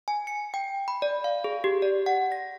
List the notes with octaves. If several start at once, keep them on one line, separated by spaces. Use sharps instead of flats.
G#5
C#7
G5
B5
D5
F5
G#4
G4
D5
F#5
A#6